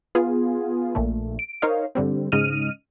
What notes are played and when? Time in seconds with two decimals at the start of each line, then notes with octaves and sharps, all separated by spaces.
0.15 B3 F4 G#4
0.95 A#1 A#2 A3
1.39 D7
1.62 D#4 A#4 C5 C#5 D#5 F5
1.95 G2 D3 G3 C4
2.32 G#2 C#3 D#5 F6 D#7